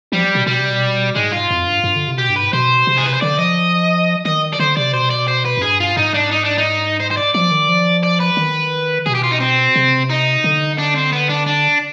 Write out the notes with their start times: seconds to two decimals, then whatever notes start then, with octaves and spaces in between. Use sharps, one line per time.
0.12 F3 G3
0.35 B2
0.47 B2 G3
0.58 C3
0.70 B2
1.16 G#2 G#3
1.33 F4
1.50 F2
1.67 G2
1.84 G2
1.96 D3
2.08 C3
2.18 B2 G4
2.30 G2
2.36 B4
2.41 G#2
2.53 B2 C5
2.87 C3
2.97 G#4
3.06 B4
3.14 C5
3.21 D3 D5
3.38 F3 D#5
4.25 D#3 D#5
4.53 D5
4.60 D3 C5
4.77 C3 D5
4.94 B2 C5
5.10 D5
5.28 C5
5.45 B4
5.57 F2
5.62 G2 G#4
5.80 F4
5.97 G#2 D#4
6.14 D4
6.31 D#4
6.44 D4
6.58 D#4
7.00 C5
7.11 C5
7.17 D5
7.34 F3 D5
7.51 D#3
7.69 F3
8.03 D5
8.20 B4
8.37 D#3
9.06 B2 G#4
9.15 G4
9.23 F4
9.32 D#4
9.40 C4
9.76 C3
10.09 D#4
10.44 D3
10.79 D4
10.96 C4
11.12 B3
11.29 D4
11.46 D4